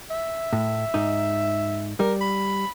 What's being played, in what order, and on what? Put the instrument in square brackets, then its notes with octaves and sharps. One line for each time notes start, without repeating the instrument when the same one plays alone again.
[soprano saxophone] E5
[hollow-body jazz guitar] A2
G#2 D#4
[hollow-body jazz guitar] G3 [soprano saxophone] A#4
[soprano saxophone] B5